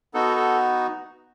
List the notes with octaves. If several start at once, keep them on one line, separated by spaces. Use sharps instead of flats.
B3 D#4 F#4 A4
A4